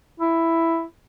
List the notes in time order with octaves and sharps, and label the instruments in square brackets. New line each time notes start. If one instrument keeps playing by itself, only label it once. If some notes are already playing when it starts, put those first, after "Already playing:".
[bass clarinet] E4